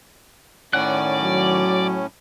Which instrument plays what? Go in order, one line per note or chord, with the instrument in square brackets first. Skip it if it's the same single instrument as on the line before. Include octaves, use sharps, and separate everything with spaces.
[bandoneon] A2 C#4 [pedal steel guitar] D#3 F#5 F#6 [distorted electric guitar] D5
[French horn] F#3